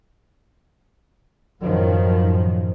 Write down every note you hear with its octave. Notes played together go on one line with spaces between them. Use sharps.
F#2 A2 D#3 F3 F#3